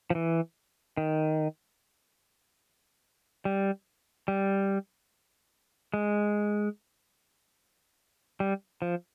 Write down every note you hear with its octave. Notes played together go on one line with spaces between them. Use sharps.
F3
E3
D#3
G3
G3
G#3
G3
F3